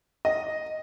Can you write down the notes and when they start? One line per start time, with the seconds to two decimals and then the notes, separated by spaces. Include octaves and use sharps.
0.25 D#5